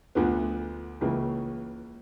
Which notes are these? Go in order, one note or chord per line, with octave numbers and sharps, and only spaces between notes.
D2 D3 F3 B3
C#2 C#3 E3 A#3